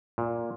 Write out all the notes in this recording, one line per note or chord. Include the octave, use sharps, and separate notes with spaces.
A#2